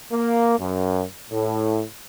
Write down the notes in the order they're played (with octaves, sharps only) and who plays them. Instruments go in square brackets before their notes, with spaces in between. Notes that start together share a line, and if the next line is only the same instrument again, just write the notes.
[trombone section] A#3
F#2
A2